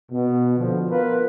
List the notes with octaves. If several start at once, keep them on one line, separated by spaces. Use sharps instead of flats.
B2
D3 F3
B3 F4 A#4 B4